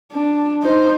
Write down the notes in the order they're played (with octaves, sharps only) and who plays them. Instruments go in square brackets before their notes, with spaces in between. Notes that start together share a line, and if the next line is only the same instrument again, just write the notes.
[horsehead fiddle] D4
D#4 C5